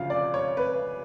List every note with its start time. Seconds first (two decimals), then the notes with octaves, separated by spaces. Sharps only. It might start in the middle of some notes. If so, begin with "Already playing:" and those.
Already playing: D2 C#3 F3 F5
0.10 D5
0.34 C#5
0.57 B4